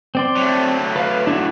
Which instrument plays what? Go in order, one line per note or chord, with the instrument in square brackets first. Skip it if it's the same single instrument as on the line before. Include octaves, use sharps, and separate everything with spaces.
[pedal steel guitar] C4 D5 C6
[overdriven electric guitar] F#3 A3
[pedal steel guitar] B4 F5
D4 E4 F#4